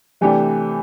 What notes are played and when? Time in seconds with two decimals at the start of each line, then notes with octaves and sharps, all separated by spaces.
0.21 C3 E3 A3 D4 G4